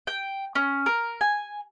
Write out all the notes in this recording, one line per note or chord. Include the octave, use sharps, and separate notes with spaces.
G5
C#4
A#4
G#5